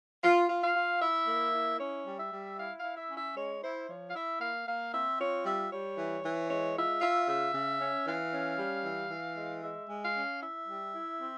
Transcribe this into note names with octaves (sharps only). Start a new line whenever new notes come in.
F4
F4
F5
F4
E4 E5
A#3
E4
C#4 C#5
G3
E5
G3
E4 F5
F5
E4
E5
C#4
E5
G#3 C#5
E4 C5
F3 C#5
F5
E4 E5
A#3 F5
A#3 F5
C4 E5
F4 C#5
G3 E5
G3 C#5
E3
E3
G#3 C#5
F4 E5
F4 E5
C#3 E5
C#3
C#4
E3 F5
C#4
G3
E3
E3
G#3
G#3 E5
G#3
F5
C#4
E4 E5
G3
E4
C4